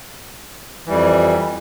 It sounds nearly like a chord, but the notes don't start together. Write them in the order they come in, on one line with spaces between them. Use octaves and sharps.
E3 G3 F2